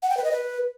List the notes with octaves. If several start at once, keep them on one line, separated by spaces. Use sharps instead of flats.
F#5
G5
B4
D#5
B4